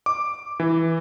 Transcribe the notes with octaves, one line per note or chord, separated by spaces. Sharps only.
D6
E3